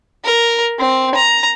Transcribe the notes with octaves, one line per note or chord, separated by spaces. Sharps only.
A#4
C4
A#5